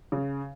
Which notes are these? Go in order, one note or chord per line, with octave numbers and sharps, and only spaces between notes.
C#3